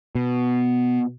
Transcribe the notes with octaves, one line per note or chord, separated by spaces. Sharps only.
B2